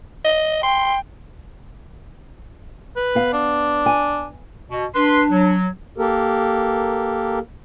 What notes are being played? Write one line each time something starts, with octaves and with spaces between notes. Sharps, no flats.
D#5
G5 C6
B4
B3 F5
D4
G#5
B2
D4 B4 C6
F#3
A#3 G4 A4 A#4